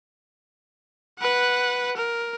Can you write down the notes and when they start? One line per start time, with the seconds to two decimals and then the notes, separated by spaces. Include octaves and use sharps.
1.19 B4 F#5
1.96 A#4